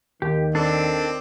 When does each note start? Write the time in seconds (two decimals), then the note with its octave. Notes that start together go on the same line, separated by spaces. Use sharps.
0.22 D#2 D#3 G4
0.55 C4 D4 A4 D5